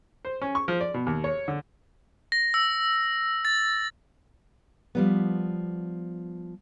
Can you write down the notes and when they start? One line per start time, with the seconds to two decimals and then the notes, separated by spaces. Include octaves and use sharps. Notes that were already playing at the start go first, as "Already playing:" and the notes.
0.25 C5
0.42 C#4
0.55 C#6
0.68 F3
0.80 D5
0.94 B2
1.06 D#2
1.24 C#5
1.48 D3
2.32 A#6
2.54 E6
3.45 A6
4.95 F3 G3 B3